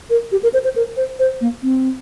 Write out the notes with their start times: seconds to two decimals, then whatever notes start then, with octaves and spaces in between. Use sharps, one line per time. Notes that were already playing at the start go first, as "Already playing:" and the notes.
0.10 A#4
0.32 G4
0.43 A#4
0.54 C5
0.64 C5
0.76 A#4
0.97 C5
1.19 C5
1.41 A#3
1.63 C4